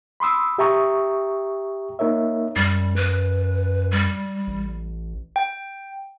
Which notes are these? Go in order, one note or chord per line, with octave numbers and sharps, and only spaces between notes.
B5 C6 D#6 E6
G4 E5 G5 A#5 C#6 D#6
A#3 D#4 A#4 C#5 E5
F#2 G3
B4
G3
A1
G5